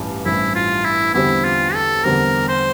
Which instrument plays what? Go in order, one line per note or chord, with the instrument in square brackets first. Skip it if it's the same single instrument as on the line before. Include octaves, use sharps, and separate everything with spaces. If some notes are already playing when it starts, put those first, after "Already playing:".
Already playing: [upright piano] A1 G2 E3 G3
[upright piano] A1 G2 E3 G3 C4 [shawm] E4
[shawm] F4
E4
[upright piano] E2 D3 G3 C4 G4 [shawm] E4
[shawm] F4
A4
[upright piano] E2 D3 G3 C4 G4 [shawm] A#4
[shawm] C5